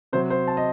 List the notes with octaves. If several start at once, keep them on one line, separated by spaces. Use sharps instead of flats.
C3 F#3 C5
C5
A5
D#5